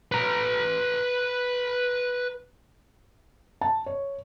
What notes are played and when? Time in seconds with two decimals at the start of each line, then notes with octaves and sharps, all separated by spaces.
0.12 B4 A#5
3.61 A5
3.86 C#5